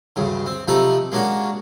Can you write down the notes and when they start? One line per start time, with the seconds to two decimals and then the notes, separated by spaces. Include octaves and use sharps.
0.16 D2 G2 C#3
0.46 C4
0.68 C3 F3 A3 D#4 E5 B5
1.12 G#3 A#3 C#4 D4 F#4